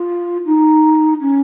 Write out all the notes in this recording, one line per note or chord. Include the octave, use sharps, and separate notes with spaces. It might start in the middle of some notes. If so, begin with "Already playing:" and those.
Already playing: F4
D#4
C#4